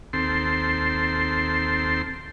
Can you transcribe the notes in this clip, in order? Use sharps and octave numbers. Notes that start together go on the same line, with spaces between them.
D#2 C4 A4 C6